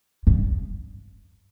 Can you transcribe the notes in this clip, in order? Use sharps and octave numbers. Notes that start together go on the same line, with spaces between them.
G2